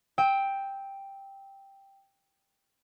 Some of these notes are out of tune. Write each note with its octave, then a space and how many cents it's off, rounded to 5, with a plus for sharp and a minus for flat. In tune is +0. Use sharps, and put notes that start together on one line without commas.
G5 +5 E6 -30